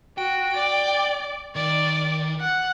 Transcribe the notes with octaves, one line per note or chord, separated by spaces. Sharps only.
F#4 G5
D5
D#3 D5
F#5